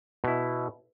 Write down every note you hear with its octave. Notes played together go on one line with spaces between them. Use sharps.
B2 E4